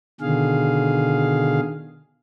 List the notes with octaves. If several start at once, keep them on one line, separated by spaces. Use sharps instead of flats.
B2 D3 D#3 G#4 F5